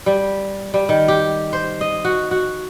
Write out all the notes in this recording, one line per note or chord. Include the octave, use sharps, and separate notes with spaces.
G3
G3
D#3
G4
C5
D#5
F#4
F#4